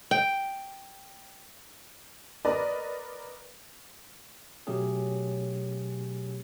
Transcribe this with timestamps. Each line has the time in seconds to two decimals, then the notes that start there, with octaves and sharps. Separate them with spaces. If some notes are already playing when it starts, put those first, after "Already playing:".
0.11 G5
2.45 A#4 B4 D5 D#5
4.67 B2 F#3 A3 C#4 G4 G#4